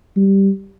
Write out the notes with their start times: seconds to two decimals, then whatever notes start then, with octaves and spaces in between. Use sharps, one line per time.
0.16 G3